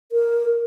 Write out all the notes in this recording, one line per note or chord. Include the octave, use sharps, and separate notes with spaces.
A#4